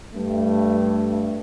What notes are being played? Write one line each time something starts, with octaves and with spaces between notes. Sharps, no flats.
G2 A3